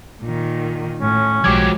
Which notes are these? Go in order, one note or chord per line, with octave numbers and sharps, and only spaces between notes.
A#2 D#3
A2 C#4
B1 F3 F#3 G#3 G4 D6 G#6